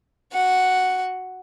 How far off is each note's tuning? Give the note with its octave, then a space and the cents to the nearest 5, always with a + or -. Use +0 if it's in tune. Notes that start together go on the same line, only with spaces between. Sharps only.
F#4 +0 F#5 +0